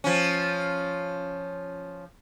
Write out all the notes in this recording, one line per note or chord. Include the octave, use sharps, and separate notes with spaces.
F3 C#4